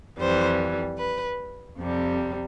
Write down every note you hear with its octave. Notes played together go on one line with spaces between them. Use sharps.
F2 E3 G3 C5
B4
F2 C3 G3